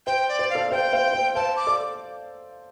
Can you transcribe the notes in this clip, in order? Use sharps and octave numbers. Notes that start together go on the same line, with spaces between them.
C5 G5
D5
C5
F5
A4 D5
C5 F5 G5
C5 F5
C5
C5 F5 A5
D6
A4 D5